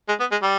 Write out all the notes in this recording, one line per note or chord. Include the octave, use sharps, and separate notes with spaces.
G#3
B3
G#3
G3